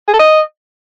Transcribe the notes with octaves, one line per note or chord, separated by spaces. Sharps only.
G#4
A4
D#5